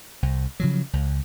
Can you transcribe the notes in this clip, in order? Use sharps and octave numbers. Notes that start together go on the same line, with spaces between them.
C2
C#3 F3 F#3
C#2